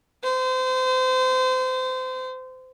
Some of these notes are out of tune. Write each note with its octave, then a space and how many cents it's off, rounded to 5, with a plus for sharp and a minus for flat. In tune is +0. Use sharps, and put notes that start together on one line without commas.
C5 -30